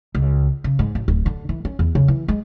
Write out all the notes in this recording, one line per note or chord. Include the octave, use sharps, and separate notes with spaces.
C#2
C#3
G#2
A1
D1
D3
E3
C#4
E2
C#3
E3
G#3